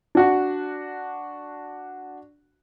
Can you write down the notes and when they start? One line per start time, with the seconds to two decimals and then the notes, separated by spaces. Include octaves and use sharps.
0.15 D4 F#4 F#5